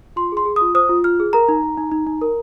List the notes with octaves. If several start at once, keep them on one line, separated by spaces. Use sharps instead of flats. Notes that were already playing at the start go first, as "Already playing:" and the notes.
F4 C6
G#4
C6
G#4
F4 D#6
C5 D#6
F4
F4 F6
G#4
A#4 A#5
D#4
D#4
D#4
D#4
D#4
A#4